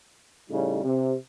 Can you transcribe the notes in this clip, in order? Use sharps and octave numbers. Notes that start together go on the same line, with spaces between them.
A2 C#3 G3 D#4
C3